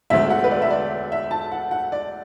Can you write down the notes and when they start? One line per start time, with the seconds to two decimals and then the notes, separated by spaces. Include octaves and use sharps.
0.10 E1 D2 D3 E5
0.30 F#5
0.44 B4
0.51 D5
0.62 E5
0.70 D5
1.12 E5
1.31 A5
1.52 F#5
1.71 F#5
1.92 D5